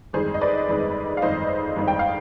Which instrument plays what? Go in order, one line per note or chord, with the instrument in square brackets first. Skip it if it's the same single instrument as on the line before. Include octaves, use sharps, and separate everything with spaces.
[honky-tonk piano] G1 F2 D#3 G#3 G#4 C5
D#5
B4 D5
G1 F2 D#3 G#3
F5
G1 F2 D#3 G#3 C5 D#5
G1 F2 D#3 G#3
G5
F5